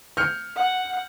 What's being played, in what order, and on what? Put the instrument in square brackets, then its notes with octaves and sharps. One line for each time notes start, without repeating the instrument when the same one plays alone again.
[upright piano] F6 G6 C#7
[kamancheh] F#5